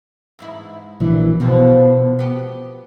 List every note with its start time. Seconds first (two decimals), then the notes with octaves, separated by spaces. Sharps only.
0.39 E2 G#2 E4
1.00 A#1 E3 F#3
1.40 B2 D3 F3 C4
2.19 B3 G4